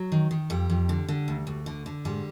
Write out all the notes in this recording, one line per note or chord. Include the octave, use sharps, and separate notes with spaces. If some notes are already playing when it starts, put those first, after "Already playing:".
Already playing: F#3
D#3
D#3
F2 G3
F2
D3
D3
D2
D2
D3
D3
G#2 G3